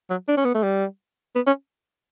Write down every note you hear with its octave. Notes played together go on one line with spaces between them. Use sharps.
F#3
D4
C#4
B3
A3
G3
B3
C#4